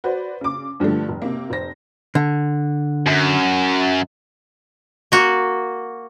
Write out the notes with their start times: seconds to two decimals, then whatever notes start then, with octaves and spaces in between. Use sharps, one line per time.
0.04 F#4 B4 C5 D5
0.41 C#3 D6
0.80 G2 D3 F3 G3 A3
1.09 F1
1.22 C3 A#3
1.50 F1 C5 A#6
2.15 D3
3.06 F#2
5.12 A#3 F#4